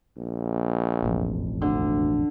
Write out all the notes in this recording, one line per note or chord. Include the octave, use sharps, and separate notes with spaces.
A#1
E1 A1 F2
D2 D3